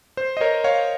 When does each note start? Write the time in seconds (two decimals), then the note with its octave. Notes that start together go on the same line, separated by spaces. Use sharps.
0.17 C5
0.37 D#5
0.41 A#4 C#5
0.64 C#5 F5